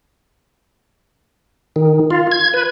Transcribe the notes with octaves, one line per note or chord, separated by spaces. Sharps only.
D#3
F4
G#6
B4